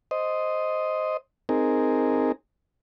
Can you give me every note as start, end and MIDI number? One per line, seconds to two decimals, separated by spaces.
0.11 1.17 72
0.11 1.17 75
1.49 2.32 60
1.49 2.32 63
1.49 2.32 68
1.49 2.32 70